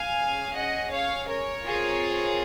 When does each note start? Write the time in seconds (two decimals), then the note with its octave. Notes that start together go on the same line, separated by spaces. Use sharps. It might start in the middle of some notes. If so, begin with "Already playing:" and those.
Already playing: F5 G#5
0.18 C#4 G#4
0.55 D#5 F#5
0.91 C#5 F5
1.29 A#4 C#5
1.65 C4 F4 G#4